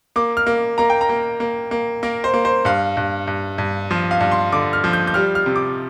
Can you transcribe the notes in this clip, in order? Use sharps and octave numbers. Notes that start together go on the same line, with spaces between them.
A#3 D6
F6
A#3
A#3 A#5
G5
A#5
A#3
A#3
A#3
A#3 A#4
C5
A#3
C5
G2 F5
G2
G2
G2
F3
F5
G2
C6
D3 D6
F6
F3
G6
G6
G3 F6
F6
C3
D6